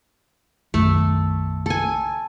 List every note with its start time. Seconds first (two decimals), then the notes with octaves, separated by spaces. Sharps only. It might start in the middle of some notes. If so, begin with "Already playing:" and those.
0.74 B1 F#2 D#3 A3
1.66 A4 G#5